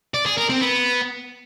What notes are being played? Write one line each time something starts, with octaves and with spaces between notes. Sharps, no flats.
D5
G#4
A#4
C4
B3